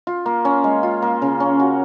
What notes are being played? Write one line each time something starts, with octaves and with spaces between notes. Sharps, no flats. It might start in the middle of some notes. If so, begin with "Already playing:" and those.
F4
A#3
C#4
G#3
F4
A#3
C#3
C#4
F#4